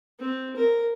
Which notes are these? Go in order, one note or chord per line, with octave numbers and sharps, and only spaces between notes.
C4
A#4